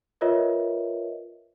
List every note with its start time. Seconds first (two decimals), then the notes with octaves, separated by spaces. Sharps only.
0.21 F4 A#4 B4 C#5 D#5 E5